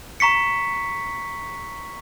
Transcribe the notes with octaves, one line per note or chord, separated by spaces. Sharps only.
A#5 C#6 B6 C#7